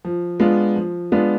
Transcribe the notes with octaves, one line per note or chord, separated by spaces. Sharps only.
F3
G#3 B3 D4 F4
F3
G#3 B3 D4 F4